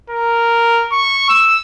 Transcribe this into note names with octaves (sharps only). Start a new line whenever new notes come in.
A#4
C#6
E6